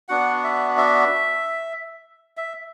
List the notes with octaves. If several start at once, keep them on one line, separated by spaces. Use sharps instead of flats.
B3 D4 F#4 F#5
E5
E5
E5